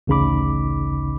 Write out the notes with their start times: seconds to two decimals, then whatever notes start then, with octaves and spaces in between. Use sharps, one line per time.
0.07 A1 D2 C#3 D#4 B5 D6